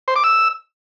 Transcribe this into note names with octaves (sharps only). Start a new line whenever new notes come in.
C5
D6
E6